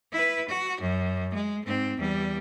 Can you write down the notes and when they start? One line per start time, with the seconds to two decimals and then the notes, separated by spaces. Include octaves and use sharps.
0.12 E4 B4
0.49 F#4
0.81 F#2
1.34 G#3
1.66 G#2 C4
1.98 E2 G3